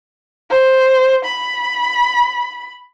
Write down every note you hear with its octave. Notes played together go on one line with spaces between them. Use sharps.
C5
B5